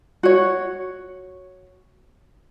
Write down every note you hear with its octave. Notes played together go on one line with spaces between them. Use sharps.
F#4 C#5